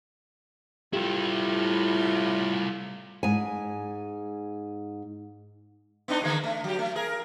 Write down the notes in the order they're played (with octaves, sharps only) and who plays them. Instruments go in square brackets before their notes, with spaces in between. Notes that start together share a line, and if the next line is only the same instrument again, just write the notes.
[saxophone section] A2 F4 [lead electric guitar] G3 E4 [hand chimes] G4
[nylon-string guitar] G#2 G#5
[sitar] B3 D4 D#4
D3 G#3 A#3
A3
F#3 G4
A3
G#4 A#4